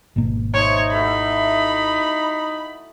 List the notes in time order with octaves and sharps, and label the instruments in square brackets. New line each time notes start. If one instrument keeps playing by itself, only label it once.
[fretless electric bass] G#1 B2 A#3
[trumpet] D#4 [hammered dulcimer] C5 E5 [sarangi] C#5
[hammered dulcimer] A3 E4 F#4 [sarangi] B5